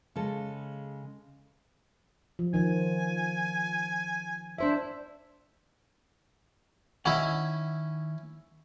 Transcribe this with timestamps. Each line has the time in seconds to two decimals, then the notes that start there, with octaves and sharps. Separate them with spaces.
0.16 C#3 G#3 A4
2.39 F3
2.54 D#3 F3 G#5
4.58 D4 E4 C5 E5
7.06 D#3 C#4 E4 F#5